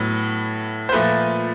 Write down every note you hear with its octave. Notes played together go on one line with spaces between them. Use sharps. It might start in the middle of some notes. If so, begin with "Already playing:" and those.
Already playing: A2 F#3 B3
C5
A#2 F3 A3 B4